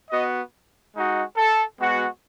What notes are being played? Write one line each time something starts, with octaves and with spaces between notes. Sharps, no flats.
B3 F#4 D#5
G#3 D#4 F#4
A4
G#3 B3 F#4